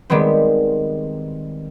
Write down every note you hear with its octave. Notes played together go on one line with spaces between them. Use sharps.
D#3 G3 G#3 B3 C4